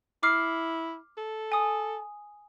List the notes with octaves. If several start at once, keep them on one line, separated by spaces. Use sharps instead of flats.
E4 D6 F6 C7
A4
G#5 D#6